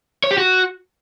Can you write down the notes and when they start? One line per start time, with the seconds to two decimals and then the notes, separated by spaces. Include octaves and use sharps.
0.24 C#5
0.31 G4
0.38 F#4